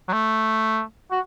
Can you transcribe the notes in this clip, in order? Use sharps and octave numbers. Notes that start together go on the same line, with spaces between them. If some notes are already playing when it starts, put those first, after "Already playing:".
F#3
A3
F#4